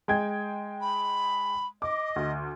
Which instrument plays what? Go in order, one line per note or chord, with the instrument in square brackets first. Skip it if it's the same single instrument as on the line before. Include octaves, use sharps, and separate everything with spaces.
[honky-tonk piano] G#3 G5 G#6
[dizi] B5
[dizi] D#5 [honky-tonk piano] D6
[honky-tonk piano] D2